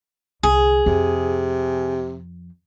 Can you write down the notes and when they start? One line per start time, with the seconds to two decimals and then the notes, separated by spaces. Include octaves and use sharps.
0.43 C2 D3 G#4
0.86 F2 C3